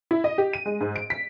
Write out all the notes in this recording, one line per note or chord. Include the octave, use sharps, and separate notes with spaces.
E4
D#5
G4
D#7
G#3
G#2
D7
B6